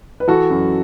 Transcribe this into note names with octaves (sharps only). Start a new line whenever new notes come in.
B4
E3 F#4 A4
F#2